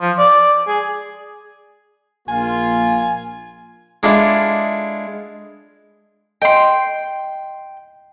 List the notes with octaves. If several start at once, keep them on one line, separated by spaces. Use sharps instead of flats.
F3
D5
G#4
A#1 A#3 F4 G#5
G#3 D4 E4 F4 A4 D5
D#5 G5 C6